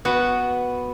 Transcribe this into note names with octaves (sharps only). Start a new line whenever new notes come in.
B3 F#4